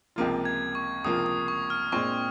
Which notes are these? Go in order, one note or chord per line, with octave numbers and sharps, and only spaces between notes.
C#2 C3 F3 A#3 F4
G#6
C#6
C#2 C3 F3 A#3 F4 D#6
D#6
C#6
F6
A#2 G#3 C4 C#6